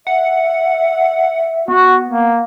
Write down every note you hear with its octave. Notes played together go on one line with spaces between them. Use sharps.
E5 F#5
B3 F#4
A#3